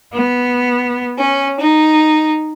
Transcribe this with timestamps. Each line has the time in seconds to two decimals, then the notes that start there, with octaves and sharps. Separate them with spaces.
0.13 B3
1.18 C#4
1.60 D#4